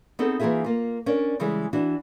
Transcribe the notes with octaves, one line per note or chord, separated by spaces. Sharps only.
B3 C4 D#4 G#4 A4
E3 A#3 D#4 F4 G#4 E5
A#3 F4
C#4 D4 A#4 D5
C#3 E3 G3 G#3 G#4
E3 D4 F#4